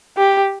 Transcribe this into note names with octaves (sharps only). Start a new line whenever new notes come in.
G4